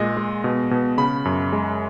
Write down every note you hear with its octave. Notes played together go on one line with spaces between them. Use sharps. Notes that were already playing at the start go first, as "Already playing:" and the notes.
Already playing: A#2 G#3 D#5
G#3
B2
B2
C#3 B5
F#2
G#3